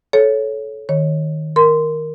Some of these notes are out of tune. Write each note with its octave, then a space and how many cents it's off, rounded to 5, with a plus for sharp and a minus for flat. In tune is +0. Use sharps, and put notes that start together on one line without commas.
A4 -15 C#5 +0
D#3 +0 C#5 -15
A#4 +0 C6 -10